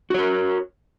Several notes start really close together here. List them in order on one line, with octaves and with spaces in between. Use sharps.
F#4 C#5 A#4